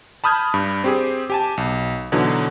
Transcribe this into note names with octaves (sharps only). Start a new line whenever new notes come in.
A5 B5 D#6 F6 G6 G#6
G2
C4 G4 G#4
G4 G#5 A5
B1
B2 D3 E3 F#3 D#4